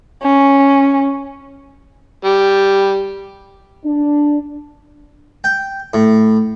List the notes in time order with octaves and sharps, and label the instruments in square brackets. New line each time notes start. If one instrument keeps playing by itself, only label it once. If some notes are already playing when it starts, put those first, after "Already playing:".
[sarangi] C#4
[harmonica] G3
[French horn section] D4
[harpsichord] G5
A2